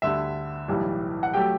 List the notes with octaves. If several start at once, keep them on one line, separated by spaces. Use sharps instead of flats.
D2 D3 G3 E5
B1 A2 E3 G3
F#5
F#3 A3 G4 G5